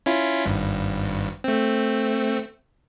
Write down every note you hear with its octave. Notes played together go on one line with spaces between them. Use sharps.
C#4 E4 F4
G#1 G2
A3 C4